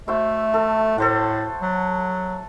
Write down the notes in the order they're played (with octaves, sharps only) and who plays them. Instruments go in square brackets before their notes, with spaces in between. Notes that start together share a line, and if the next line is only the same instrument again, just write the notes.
[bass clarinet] A3 [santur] F#4 C5 E5
[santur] A4
[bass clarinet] A2 [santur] A4 C5 F#5
[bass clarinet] F#3